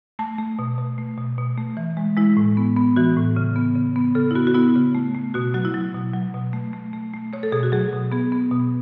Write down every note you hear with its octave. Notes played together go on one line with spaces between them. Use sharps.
A3 A5
A3
B2
B2
A3
B2
B2
A3
E3
G#3
G#3 E4
A2
B3
B3
E3 F#4
A2
C#3
B3
C#3
B3
C#3 A4
E4
B3 F#4
F#4
B3 E4
C#3
A3
A3
B2 F#4
F#3 F#4
E4
F#3
B2
F#3
B2
A3
A3
A3
A3
A3 C#5
A4
B2 G#4
F#4
F#3 G#4
B2
B3 G#4
B3
B2